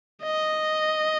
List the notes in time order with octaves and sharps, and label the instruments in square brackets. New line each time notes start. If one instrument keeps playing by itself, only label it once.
[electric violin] D#5